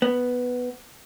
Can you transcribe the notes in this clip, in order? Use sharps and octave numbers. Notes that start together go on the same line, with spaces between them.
B3